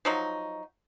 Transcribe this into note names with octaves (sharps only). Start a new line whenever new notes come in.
F3 F#3 D#4